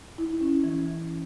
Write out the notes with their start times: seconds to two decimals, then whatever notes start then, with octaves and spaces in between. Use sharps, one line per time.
0.18 E4
0.41 C#4
0.64 E3